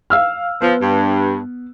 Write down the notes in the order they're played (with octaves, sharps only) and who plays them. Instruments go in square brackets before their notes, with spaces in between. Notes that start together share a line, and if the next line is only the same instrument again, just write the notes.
[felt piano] F5 E6 F6
[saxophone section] F3 [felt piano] B3
[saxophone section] G2